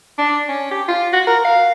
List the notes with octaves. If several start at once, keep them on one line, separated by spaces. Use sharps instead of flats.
D4
C#4
G4
F4
F#4
A#4
F5